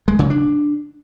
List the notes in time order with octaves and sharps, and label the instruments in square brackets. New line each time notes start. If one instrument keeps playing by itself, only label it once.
[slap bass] G#3
C#3
D4